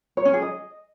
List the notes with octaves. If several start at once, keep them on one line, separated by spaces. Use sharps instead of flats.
C#5
C#4
G#4
D#5